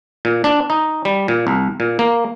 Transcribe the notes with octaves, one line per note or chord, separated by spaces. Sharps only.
A#2
D4
D#4
G3
A#2
C2
A#2
A#3